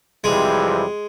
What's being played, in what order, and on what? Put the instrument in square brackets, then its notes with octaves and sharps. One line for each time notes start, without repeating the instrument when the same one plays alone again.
[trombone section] F2 C3 E3 G3 [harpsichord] G#3